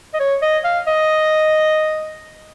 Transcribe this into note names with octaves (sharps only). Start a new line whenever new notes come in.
D#5
C#5
D#5
F5
D#5